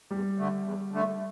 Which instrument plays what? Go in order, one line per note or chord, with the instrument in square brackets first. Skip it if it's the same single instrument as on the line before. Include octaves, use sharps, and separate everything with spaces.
[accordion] E2 [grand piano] G3
[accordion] D3 A3
E2
D3 A3